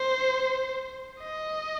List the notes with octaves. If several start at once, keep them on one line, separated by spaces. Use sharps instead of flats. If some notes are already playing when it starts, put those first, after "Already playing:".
Already playing: C5
D#5